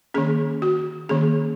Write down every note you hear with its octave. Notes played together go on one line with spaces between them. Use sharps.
D#3 A#3 C#4 G#4
F#4
D#3 A#3 C#4 G#4